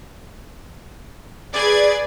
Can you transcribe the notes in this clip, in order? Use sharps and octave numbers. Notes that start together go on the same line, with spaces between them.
G#4 B4 D5 G#6 A6